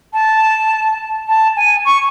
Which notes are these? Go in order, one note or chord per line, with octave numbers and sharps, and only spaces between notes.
A5
A5
G#5
C#6